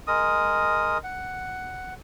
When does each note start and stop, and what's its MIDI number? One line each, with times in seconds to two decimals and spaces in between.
0.07 0.98 56
0.07 0.98 70
0.07 0.98 87
1.04 1.94 78